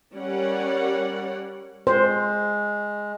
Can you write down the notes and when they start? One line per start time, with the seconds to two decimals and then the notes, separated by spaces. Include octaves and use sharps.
0.14 G3 C#4 A#4 C#5 D5 F#5
1.87 G#3 C5